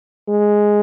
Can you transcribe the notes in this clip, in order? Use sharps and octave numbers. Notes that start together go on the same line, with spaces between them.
G#3